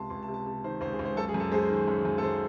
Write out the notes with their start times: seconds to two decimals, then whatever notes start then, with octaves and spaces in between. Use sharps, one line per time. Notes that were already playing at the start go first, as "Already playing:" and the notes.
Already playing: C#2 C3 A5 C6
0.10 C#2 C6
0.23 A5
0.28 C3
0.34 A5
0.46 C3 A5
0.64 D#3 C5
0.81 C#2 C5
0.93 G#4
0.99 C#2
1.05 C5
1.16 F#2 A4
1.28 G#4
1.34 F#2
1.40 A4
1.52 G#3 C5
1.69 D#3
1.88 F#2
2.05 F#2
2.18 A4
2.23 F#2 C5